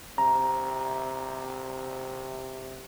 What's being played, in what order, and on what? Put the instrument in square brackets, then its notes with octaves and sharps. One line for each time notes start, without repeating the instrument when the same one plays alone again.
[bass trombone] C3 [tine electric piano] A#5